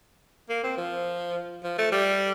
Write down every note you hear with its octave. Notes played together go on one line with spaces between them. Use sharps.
A#3
C4
F3
F3
A3
G3